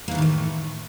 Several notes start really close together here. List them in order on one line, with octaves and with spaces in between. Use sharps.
A#3 E3 D#3 A2 A3